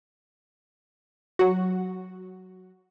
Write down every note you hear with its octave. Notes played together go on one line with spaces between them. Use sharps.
F#3 F#4